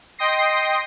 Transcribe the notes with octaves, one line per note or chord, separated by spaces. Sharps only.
D#5 G5 C6 D#6 A#6 C7